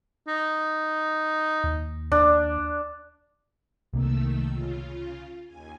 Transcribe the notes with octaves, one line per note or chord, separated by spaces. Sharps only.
D#4
D#2
D#2 D4
C2 C3 D#3 A3 A#3 E6
C#3 F4
D#2 G#5